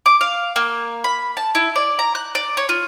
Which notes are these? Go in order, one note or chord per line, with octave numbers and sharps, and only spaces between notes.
D6
F5
A#3
B5
A5
E4
D5
A#5
F#6
D5
C#5
F4